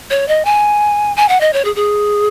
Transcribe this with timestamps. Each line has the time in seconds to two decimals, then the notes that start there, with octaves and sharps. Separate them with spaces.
0.10 C#5
0.28 D#5
0.45 G#5
1.16 G#5
1.29 F#5
1.40 D#5
1.53 C#5
1.65 G#4
1.76 G#4